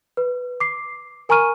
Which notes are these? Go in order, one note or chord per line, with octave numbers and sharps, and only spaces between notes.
B4
D6 C7
A#4 G#5 A#5 C#6 F6 D#7